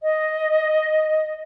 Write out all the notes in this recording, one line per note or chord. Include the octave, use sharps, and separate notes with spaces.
D#5